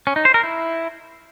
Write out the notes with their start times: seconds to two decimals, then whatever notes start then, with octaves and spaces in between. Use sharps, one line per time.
0.07 C#4
0.16 D#4
0.25 C5
0.34 A#4
0.43 E4